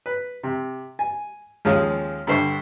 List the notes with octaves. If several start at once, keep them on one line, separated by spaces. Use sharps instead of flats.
B4
C3
G#5
D#2 F3 G#3 C#4 F5 D#6
G2 D3 C5 E5 C#6